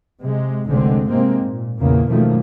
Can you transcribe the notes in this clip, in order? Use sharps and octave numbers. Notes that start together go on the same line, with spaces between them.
C3 G#3
F1 B1 D3 G#3 C4
G#2 C3 G#3 A#3 C4
A#2
A#1 E2 A#2 C#3 A#3
F#2 B2 D#3 F3 A3 A#3